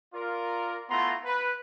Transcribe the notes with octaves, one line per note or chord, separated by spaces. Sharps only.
F4 A#4 D5
A3 B3 E4 F4 A#5 C6
B4